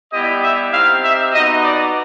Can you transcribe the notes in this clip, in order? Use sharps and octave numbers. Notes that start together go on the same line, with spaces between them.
G3 B3 E4 G4 D#5
E5
C4 D#4 G4 F5
E5
B3 D#4 F#4 D#5
D5